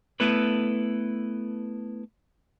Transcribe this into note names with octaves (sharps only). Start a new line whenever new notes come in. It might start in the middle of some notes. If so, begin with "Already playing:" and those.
A3 B3 E4 A4 B4